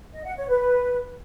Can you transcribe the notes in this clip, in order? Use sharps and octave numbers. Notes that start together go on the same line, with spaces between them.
D#5
F#5
C#5
B4